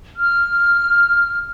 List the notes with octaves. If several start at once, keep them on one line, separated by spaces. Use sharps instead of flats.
F6